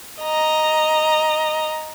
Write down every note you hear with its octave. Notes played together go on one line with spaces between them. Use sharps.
D#5 A#5